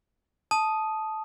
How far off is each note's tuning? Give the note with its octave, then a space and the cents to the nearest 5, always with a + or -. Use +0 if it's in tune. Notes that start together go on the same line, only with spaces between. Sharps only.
A5 -10 D#6 +0